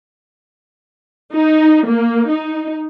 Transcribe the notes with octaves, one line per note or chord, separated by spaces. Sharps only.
D#4
A#3
D#4